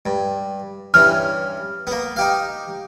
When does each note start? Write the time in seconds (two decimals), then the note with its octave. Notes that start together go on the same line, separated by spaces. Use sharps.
0.06 G2
0.94 G2 E3 C#4 F6
1.87 A#3 B3
2.16 D#4 G4 F5